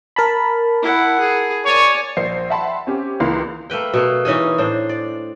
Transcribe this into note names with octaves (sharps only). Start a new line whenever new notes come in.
A#4 A5 B5
E4 F#5
G#4
C#5 D5 G#5
A#1 C5 C7
E5 F#5 G5 A5 B5 C6
C4 C#4 G4
C#2 E3 A#3 B4 F5 C6
A3 A#3 B4 G5
B2 A3 A#3
E3 C#4 D#4 G#4
A2 D4 C5
D5